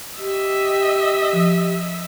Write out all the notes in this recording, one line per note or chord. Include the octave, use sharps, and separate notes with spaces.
G4 D#5 E5
F3